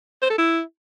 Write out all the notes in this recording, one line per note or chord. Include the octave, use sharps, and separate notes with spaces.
C5
A4
E4